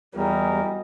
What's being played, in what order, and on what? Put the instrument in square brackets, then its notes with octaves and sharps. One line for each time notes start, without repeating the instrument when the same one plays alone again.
[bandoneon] E2 [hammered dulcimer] F#3 G#4 D#5 [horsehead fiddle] G3 [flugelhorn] A#4